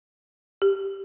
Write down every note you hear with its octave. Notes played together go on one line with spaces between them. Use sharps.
G4